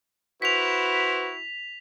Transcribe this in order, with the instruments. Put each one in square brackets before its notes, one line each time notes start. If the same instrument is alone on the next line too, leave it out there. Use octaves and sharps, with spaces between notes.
[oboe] E4 [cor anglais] F#4 [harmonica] B4 C5 [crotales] B6 F7